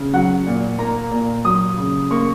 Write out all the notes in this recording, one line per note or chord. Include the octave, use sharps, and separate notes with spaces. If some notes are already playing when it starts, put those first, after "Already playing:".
Already playing: C#3
F#3 F#5
A#2
A#3 A#5
A#2
F#3 D#6
C#3
A#3 C#6